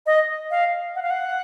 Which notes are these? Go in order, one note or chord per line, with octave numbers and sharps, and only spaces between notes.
D#5
F5
F#5
F5
F#5